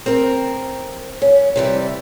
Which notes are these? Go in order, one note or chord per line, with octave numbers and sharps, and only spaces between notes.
C4 A#4
C#4
C3 E3 G3